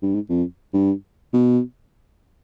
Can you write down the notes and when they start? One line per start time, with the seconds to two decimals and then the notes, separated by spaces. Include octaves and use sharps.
0.02 G2
0.14 G#2
0.29 F2
0.73 G2
1.33 B2